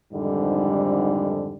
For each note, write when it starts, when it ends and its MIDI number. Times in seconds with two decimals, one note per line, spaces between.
0.13 1.57 41
0.13 1.57 44
0.13 1.57 50
0.13 1.57 51
0.13 1.57 55